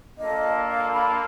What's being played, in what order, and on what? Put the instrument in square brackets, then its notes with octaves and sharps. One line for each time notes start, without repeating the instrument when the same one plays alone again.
[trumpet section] A#3 D4 F4 A4 [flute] D#5
[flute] F5
B5